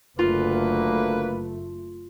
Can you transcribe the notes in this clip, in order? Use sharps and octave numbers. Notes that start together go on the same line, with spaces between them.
F#1 D2 A3 A#3 F4 B4